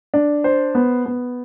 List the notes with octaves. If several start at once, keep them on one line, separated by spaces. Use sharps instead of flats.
D4
C5
B3
B3